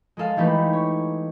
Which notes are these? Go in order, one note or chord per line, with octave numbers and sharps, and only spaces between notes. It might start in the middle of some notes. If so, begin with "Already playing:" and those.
G#3 G#4 A4 F5
E3 G#3 A3 D#4 G4 B4
C#5